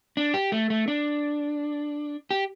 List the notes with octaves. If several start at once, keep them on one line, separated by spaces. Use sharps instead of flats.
D4
G4
A3
A3
D4
G4